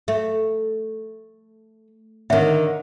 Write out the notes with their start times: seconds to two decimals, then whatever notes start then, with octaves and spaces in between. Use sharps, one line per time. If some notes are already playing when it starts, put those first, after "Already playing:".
0.08 A3 E5
2.30 D3 D#3 C#5 E5